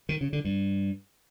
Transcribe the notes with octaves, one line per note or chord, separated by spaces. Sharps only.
D#3
C#3
D3
G2